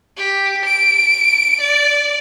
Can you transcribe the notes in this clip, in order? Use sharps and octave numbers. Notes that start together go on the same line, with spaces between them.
G4
D7
D5